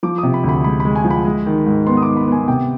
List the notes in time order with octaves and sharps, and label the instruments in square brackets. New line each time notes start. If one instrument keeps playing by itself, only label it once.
[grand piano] F3 D6
D#6
C3
B5
D2
B5
G#3 B5
B5
G#3
G#5
F3
B5
G#3
D#3
G#2
B3 C6
D#6
D#3 D6
B5
B3 G#5
C3 G5